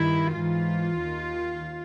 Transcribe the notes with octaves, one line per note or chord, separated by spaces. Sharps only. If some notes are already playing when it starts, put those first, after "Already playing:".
Already playing: G2 D#3 E4
G#2 E3 F4
D#2 D#3